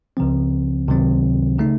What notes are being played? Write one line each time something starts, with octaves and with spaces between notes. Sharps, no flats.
C#2 C#3 F3 C4
C#2 C3 D#3 F#3 C4
C#3 A3 D#4